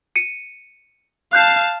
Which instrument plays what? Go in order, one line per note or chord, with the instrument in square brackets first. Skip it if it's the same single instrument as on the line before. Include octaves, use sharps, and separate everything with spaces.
[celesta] C#7 D#7
[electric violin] F5 A5 [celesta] F#6 G6 C7